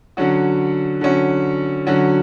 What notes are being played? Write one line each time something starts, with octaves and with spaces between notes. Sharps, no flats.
D3 F#3 C#4 F#4
D3 F#3 C#4 F#4
D3 F#3 C#4 F#4